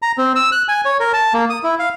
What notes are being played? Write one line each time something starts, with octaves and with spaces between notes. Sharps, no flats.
A#5
C4
E6
F#6
G#5
C#5
A#4
A5
A#3
D#6
E4
F5